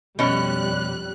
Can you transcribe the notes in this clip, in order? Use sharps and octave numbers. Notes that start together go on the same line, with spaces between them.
F2 B2 G3 C#4 F#6